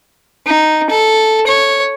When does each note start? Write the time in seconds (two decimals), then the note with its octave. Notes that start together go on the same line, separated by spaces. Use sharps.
0.47 D#4
0.90 A4
1.47 C#5